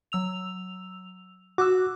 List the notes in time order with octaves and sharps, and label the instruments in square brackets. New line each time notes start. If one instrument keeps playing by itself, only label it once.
[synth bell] F#3 E6 F7
[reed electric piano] F#4 E6 [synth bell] D6 F#6